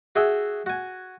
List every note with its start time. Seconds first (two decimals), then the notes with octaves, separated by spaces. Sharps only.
0.16 F#4 G#4 E5 G5
0.66 F#4 G#5